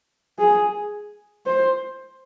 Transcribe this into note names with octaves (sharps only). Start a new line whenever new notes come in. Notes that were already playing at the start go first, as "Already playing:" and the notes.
G#4
C5